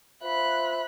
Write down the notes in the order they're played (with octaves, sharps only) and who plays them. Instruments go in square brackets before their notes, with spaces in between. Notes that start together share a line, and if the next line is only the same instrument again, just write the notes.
[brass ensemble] F4 C5 E5 [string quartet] B5 F#6